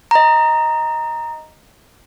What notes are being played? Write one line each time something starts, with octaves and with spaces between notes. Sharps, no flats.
D#5 A#5